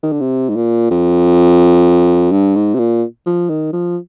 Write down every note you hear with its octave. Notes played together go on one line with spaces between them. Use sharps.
D#3
D3
C3
G#2
A#2
F2
G2
G#2
C3
A#2
F3
D#3
F3